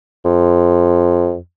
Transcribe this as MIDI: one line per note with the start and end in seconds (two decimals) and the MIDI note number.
0.25 1.37 41